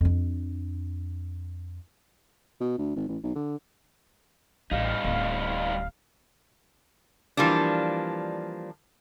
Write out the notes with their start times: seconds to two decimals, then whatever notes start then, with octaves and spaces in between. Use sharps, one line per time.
0.01 F2 D4
2.61 B2
2.78 D2
2.96 G#1
3.08 A1
3.23 B1
3.35 D3
4.71 A1 G3 D#4 F5
5.04 D1
7.37 E3 F3 G3 A#3 D4